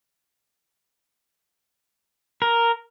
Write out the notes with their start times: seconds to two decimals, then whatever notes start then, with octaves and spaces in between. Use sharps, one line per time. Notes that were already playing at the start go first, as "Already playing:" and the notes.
2.42 A#4